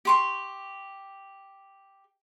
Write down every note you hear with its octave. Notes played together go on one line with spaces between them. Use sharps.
G4 C6 C#6